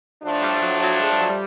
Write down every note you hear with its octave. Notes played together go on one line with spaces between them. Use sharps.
A2 F3 A3 D4
G3
F#3
F#3
G#3
G3
F#3
G3